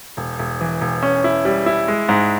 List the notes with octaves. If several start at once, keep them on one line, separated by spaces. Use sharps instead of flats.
E1
E1
E3
E1
C#4
E4
G3
E4
G#3
G#2